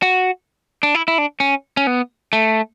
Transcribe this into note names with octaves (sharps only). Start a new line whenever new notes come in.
F#4
D4
E4
E4
D4
C#4
C#4
B3
A3